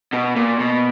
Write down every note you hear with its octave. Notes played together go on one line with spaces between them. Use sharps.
B2
A#2
B2